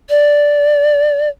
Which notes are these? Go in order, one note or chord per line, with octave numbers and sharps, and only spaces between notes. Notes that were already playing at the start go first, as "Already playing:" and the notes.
D5